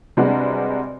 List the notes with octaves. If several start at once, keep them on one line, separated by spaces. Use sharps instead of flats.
C3 G3 G#3 D4 F#4 B4